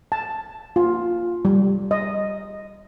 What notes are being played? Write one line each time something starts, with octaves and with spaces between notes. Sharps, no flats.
A5
F4
G3
D#5